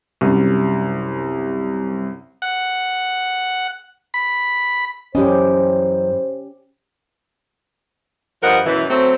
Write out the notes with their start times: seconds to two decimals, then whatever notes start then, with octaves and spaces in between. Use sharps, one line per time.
0.21 C2 F#2
2.42 F#5
4.14 B5
5.15 F#2 E3 C#4 G4 C5 D#5
8.43 G2 F3 A#4 D#5 F#5
8.65 F#2 B2 E3
8.90 F#3 A3 C4